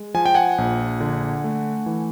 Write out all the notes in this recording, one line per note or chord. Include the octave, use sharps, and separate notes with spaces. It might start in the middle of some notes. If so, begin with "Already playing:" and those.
Already playing: G#3
F3 G#5
G5
F#5 G#5
A#1
D3
A3
E3